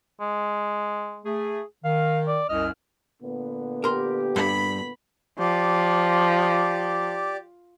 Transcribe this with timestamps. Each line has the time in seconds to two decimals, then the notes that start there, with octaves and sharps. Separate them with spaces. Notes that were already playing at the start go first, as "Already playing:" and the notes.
0.21 G#3
1.25 A3 G#4
1.84 D#3 F5
2.27 D5
2.49 C2 F#2 D#5 F6
3.21 A#2 D3 B3
3.84 G4 A#4 C6
4.36 G2 B5
5.39 F3 G4 D5